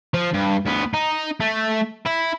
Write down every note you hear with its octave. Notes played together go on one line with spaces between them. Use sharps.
F3
G2
D2 B3
D#4
A3
E4